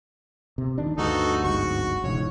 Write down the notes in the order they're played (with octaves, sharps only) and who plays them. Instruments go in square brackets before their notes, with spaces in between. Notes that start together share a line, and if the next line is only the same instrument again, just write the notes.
[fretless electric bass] C3
D#1 D#3 D4
[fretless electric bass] D2 G2 [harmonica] D#4 F#4 A4
[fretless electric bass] D1 G1 G#2 [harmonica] F#4 C#6
[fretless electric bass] E1 C#2 G#2 [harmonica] C#5